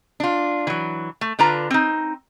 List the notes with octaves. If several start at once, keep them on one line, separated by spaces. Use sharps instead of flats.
D4 F4
E3 F#3
A3
D3 D4 F4 B4 A#5
C4 D#4